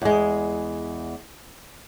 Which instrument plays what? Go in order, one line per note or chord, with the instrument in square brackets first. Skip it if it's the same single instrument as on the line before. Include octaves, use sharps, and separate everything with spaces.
[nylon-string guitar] E2 G#3